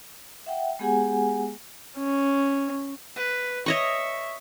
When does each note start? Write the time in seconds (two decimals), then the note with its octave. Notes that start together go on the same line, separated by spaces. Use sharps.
0.46 E5 F#5 G5
0.79 G#3 B3 G4 G#4 F#5 G#5
1.98 C#4
3.16 B4
3.66 C#5 D#5 E5 C#6